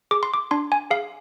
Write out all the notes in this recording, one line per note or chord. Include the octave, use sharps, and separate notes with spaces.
G#4 D6
C6
D6
D4 C6
G#5
G#4 F5